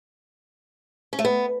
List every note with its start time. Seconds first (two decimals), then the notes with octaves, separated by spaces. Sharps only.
1.13 C#4
1.19 A3
1.25 B3